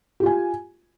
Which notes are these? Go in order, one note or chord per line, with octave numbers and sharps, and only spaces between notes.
F4 G4 G#5